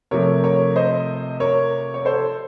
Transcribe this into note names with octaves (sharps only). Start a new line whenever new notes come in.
C3 F3 A3 A#4 C#5
A#4 C#5
C5 D#5
A#4 C#5
C#5
A4 C5